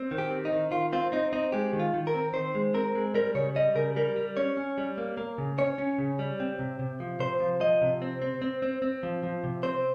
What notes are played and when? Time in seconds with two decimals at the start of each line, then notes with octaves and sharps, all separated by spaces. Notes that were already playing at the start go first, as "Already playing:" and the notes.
Already playing: C4
0.11 D#3
0.18 G4
0.31 C4
0.45 D#4
0.52 D#3
0.71 D#3 F4
0.93 C4 F4
1.12 C4 D#4
1.33 C4 D#4
1.52 G#3 G4
1.73 D#3
1.79 F4
1.94 D#3
2.07 A#4
2.14 C4
2.33 D#3 C5
2.55 G#3
2.74 C4 A#4
2.95 G#3
3.14 G3 A#4
3.35 C#3 C#5
3.56 G3 D#5
3.75 C#3 A#4
3.96 G3 A#4
4.16 G3
4.37 C#4 C#5
4.57 C#4
4.78 G3
4.98 A#3
5.17 A#3
5.38 C#3
5.58 C#4 C#5
5.78 C#4
5.98 C#3
6.19 G3
6.40 C4
6.59 C3
6.79 C3
7.00 F3
7.20 C3 C5
7.40 F3
7.60 F3 D#5
7.82 C3
8.02 C4
8.22 C4
8.42 C4
8.62 C4
8.82 C4
9.03 F3
9.23 F3
9.44 C3
9.63 C4 C5